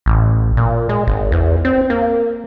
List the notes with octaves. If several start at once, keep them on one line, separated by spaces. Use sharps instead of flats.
A1
A#2
G#3
G#1
E2
C4
A#3